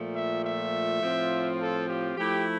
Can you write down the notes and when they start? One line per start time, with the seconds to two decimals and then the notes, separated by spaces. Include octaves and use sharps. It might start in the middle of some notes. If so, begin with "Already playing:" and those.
Already playing: A#2 F3 A3
0.15 E5
0.44 E5
1.02 A2 F3 C4 F4
1.60 A4
1.89 G4
2.17 F3 A3 E4 G4